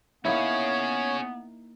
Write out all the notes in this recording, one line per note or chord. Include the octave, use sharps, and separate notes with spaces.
A#3 B3 C#4 D#4 E4 G#4 C#5